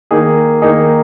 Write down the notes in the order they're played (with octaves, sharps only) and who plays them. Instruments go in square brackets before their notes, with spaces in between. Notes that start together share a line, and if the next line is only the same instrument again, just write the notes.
[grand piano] D#3 A#3 D#4 G#4
D#3 A#3 D#4 G#4